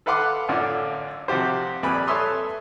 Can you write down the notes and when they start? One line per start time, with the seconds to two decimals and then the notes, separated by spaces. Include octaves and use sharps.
0.06 A4 B4 F5 F#5 C6 D6
0.48 A1 F#2 D3 F4
1.28 C3 F3 F#4 G4 C5
1.83 F2 A#2 G3 B4 G#5 B5
2.07 A4 B4 C#5 E5 C6 D#6